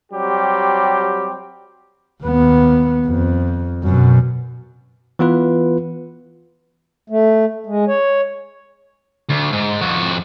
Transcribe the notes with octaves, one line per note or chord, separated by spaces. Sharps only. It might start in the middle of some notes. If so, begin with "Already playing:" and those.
F#3 G3 C4 G4
D#2 B3
F2
F#2 B2
E3 B3 F4 B4
A3
G#3
C#5
D2
G#2
F2 F#4